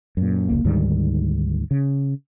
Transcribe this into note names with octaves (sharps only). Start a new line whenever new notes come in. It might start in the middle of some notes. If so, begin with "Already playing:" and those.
F#2 A#2
F1 C#2 A#3
D2 G#2 D#3 G3
C#3